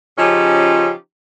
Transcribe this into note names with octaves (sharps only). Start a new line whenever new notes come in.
C#3 F3 C#4 D#4 F4 G4